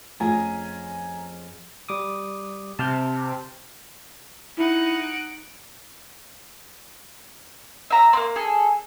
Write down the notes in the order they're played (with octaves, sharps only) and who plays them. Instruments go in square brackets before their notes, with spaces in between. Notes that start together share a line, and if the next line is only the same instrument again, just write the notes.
[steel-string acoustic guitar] F2 C#4 G#4 [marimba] A3 F4 [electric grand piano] G#5 A#5
[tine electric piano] G3 D6 D#6
[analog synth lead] C3 [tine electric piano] A5 F6 G6
[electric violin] D#4 F#5 [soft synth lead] E4
[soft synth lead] D7
[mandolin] E5 A#5
A#3 C4
G#4 A4